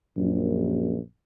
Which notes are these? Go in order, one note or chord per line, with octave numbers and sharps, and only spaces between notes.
A#1 F#2